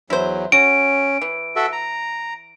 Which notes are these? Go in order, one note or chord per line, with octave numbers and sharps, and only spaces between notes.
E2 F#3 E4 C5
C#4 F#4 D7
E3
F#4 A4 E5
A#5